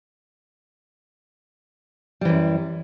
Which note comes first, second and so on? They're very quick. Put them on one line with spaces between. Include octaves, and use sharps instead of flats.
G3 E3 F#2